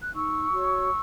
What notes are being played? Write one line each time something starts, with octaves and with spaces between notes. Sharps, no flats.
F#6
D#4 C#6 E6
F#4 C#5